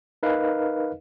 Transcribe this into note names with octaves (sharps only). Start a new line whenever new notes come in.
D#4 A#4 B4 D#5 F5